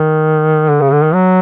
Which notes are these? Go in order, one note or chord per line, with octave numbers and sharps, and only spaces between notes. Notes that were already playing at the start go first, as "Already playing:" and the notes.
Already playing: D#3
D3
C#3
D3
D#3
F#3